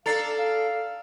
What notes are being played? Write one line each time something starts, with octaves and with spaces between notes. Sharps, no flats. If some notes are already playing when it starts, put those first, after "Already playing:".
D4 A4 F5 A#5 A6 C7
F5